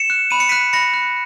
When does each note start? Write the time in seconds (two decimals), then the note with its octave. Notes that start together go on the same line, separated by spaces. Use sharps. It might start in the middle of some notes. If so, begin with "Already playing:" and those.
Already playing: C#7 E7
0.10 F#6
0.31 B5 D#7
0.40 C#7
0.49 F#6 B6 D#7
0.73 B5 A#6 C#7
0.94 F#6